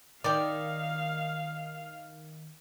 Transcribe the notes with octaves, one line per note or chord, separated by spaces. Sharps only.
D#3 G4 D5 F5